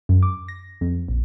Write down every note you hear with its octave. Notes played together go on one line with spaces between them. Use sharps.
F#2
D6
A#6
F2
A#1